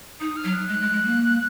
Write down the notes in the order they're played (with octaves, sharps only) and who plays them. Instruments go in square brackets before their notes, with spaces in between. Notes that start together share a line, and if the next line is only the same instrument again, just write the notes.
[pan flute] D#4 [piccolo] D#6
[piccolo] F6
[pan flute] F#3
[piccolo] F#6
[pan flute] G#3 [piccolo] F#6
[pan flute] G#3
G#3
A#3